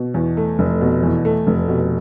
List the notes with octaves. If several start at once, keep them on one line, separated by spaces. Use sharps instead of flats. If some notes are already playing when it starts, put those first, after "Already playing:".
Already playing: B2
E2
A3
F1
B2
E2
A3
F1
B2